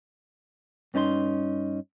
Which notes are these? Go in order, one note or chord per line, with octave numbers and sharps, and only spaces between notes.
G2 C#4 D#4 A4 C6